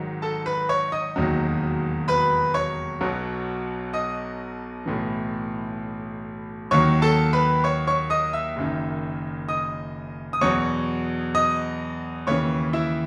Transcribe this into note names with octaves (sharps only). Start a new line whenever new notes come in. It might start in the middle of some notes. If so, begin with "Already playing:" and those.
Already playing: G#1 G#2 D#3 F#3
A4 A5
B4 B5
C#5 C#6
D#5 D#6
E1 D#2 D#3 F#3
B4 B5
C#5 C#6
B1 B2 F#3
D#5 D#6
B1 A2 E3
D#2 D#3 F#3 C#5 C#6
A4 A5
B4 B5
C#5 C#6
C#5 C#6
D#5 D#6
E5 E6
F#1 F#2 D#3
D#5 D#6
D#6
E2 B2 F#3 C#5 C#6
D#5 D#6
D#2 C#3 E3 C#5 C#6
E4 E5